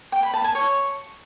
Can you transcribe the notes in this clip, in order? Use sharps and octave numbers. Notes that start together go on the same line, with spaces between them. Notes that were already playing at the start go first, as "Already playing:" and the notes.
G5
B5
A5
G#5
C#5